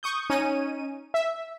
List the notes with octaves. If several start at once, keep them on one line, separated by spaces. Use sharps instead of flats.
C#6 D#6 G6
C#4 D#4 C#5 D#7
E5